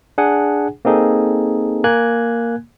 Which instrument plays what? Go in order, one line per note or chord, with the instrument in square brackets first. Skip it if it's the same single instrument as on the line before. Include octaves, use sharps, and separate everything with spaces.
[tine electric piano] D4 G#4 F#5 G#5
A#3 C4 D#4 G#4 A4
A#3 G#5 F#6 G#6